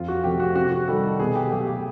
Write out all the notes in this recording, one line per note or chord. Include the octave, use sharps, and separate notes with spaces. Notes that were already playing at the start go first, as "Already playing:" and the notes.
Already playing: F2 F4
F#4
C3 F3 A3 G4
F#4
C3 F#4
F#4
D#3 G3 A4
A4
B2 G#4
G4
F#3 A3 G4
G4